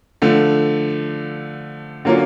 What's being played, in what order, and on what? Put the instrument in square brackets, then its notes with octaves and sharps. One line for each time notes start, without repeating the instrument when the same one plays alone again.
[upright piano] D3 F3 A3
D3 F#3 A#3 C#4 F4